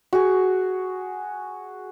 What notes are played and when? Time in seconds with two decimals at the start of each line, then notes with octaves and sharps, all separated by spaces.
0.13 F#4 G#4